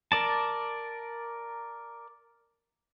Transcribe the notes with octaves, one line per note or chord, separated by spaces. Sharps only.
A#4 D5 A5